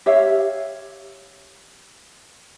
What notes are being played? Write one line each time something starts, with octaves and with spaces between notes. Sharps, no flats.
G4 C#5 E5 F5